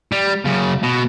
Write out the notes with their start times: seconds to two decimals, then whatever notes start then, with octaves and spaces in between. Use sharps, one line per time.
0.12 G3
0.45 F#2 C#3
0.83 B2